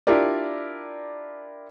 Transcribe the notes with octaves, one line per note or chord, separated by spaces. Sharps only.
D4 E4 F4 G4 A#4 D5